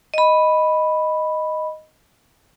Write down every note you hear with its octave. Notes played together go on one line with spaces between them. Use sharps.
D#5 B5